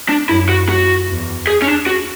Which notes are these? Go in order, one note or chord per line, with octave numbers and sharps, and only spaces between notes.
D4
F#2 E4
F#4
F#2 F#4
E2
G#4
C#4
D4
F#4